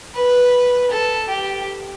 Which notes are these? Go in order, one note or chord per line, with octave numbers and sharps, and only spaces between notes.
B4
A4
G4